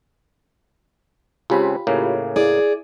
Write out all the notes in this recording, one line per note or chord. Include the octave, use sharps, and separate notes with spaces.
C#2 C#3 C4 F4 G4 B5
A2 C#3 A#3
E4 G#4 D5